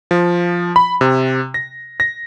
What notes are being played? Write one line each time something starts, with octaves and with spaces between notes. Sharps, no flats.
F3
B5
C3
A#6
A#6